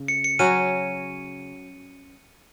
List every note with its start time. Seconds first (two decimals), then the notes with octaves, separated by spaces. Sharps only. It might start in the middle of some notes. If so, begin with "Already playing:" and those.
Already playing: C#3
0.08 C#7
0.24 C#7
0.39 F#3 C#4 F#4 D#7